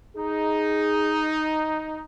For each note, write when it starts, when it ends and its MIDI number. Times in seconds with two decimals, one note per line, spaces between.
0.16 2.03 63
0.16 1.33 68